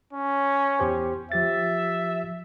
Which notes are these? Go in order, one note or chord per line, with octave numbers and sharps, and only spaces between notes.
C#4
E2 G4 C5
F3 G4 E5 A6